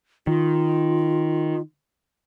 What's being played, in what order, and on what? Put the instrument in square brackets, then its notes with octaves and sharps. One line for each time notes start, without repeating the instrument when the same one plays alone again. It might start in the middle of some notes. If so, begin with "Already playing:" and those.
[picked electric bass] D#3 [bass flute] F4